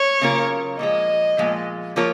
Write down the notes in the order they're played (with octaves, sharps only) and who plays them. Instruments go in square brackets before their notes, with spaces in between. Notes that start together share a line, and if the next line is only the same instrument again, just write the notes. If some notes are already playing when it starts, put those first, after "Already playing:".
Already playing: [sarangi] C#5
[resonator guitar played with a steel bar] C#3 F#3 A#3 F4 A#4
[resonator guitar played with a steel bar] A#2 F3 G#3 [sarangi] D#5
[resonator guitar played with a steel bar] A#2 F3 G#3
F3 A#3 F4 A#4 C#5